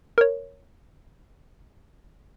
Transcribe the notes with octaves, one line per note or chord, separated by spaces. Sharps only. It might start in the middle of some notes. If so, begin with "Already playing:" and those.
A#4 C#5